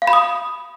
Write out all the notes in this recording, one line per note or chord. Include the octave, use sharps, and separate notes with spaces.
F5
B5
D#6